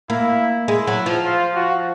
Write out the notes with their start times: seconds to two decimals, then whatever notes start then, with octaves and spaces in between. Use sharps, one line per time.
0.10 A#3 E4
0.68 G#3 E4
0.87 F#3
1.06 F3
1.25 F4
1.55 F#4